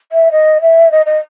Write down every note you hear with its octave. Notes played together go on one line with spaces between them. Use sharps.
E5
D#5
E5
D#5
D#5